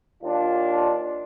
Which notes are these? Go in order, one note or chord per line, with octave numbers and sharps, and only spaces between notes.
D#2 D4 F4